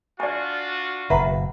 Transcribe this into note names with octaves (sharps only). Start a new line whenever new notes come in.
D4 F4 F#4 D5 G#5
F#1 B2 B4 E5 F#5 A#5